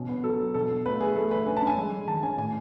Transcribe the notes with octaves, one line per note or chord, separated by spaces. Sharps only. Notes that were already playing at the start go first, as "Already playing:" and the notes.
Already playing: B2 C#4
B3
F#3 A4
F#3
B2 A4
B2
A3 B4
A3 G#4
A3 A4
A3 B4
C#4 G#5
A5
C#4
G#5
G#3
G#3
D#3 A5
C#4 G#5
A2 G#5